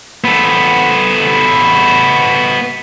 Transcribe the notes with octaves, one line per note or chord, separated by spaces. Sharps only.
B3 A4